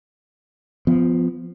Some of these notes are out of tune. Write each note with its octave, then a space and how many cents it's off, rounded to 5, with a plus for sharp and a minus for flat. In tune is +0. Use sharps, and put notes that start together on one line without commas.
F3 +0 B3 +25